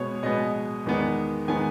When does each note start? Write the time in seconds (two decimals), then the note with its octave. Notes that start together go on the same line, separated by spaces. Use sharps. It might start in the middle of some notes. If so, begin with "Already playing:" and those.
Already playing: B2 G#3 B3 C#5
0.23 B2 G#3 B3 D#5
0.86 E2 D#3 G#3 B3
1.48 D#3 G#3 B3 G#5